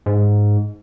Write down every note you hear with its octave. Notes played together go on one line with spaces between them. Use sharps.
G#2